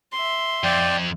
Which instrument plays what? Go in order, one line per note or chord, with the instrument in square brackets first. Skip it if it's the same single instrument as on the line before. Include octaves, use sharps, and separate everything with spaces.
[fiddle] E5 C6
[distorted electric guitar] F2 [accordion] D5 G5